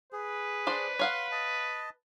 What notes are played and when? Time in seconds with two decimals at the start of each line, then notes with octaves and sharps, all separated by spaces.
0.13 G#4 B4
0.67 D4 C5 D5
0.99 C#5 F5 F#5 C6
1.32 D#5 A5